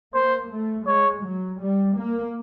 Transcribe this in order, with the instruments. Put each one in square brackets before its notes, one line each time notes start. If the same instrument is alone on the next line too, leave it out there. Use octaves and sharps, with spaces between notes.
[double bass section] A#3 [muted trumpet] C5
[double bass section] A3
[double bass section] G#3 [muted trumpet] C#5
[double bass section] F#3
G3
A#3